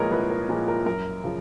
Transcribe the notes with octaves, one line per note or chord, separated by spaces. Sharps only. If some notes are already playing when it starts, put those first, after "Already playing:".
Already playing: C2 A#2 F3 G#3 A#4 B4 C#5 D#5
C2 B4
A#4
A#2 F3 G#3
A#4
F#2 A#4
C#3 F3